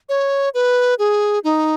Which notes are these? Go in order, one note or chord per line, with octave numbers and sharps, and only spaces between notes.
C#5
B4
G#4
D#4